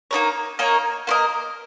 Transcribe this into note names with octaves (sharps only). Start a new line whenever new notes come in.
A#3 D#4 A#4 C#5
A#3 D#4 A#4 C#5
A#3 F4 A#4 D#5